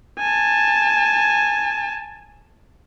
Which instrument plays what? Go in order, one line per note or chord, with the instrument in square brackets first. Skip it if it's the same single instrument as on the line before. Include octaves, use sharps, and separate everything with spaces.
[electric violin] G#5 A5